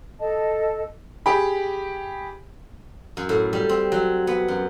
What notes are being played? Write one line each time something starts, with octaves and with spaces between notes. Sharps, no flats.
A4 D#5 A5
G4 G#4 G5 B5
F#2
A2
G3
C4
F#3
B3
F#2